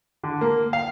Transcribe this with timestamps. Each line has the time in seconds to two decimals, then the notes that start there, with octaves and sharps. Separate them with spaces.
0.24 D3
0.41 A#3
0.73 F5